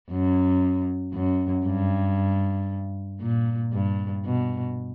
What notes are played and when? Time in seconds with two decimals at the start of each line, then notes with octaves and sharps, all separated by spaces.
0.10 F#2
1.13 F#2
1.66 G2
3.21 A#2
3.73 G2
4.25 B2